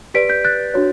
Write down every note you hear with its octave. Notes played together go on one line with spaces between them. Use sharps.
G4 B4 D5 B6 D7
G6 B6
F#6 A6
D4 F#4 C#5